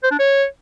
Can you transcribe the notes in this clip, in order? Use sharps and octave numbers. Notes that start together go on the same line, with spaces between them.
C5
D4
C#5